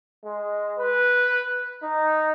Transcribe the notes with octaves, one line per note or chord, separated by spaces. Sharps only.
G#3
B4
D#4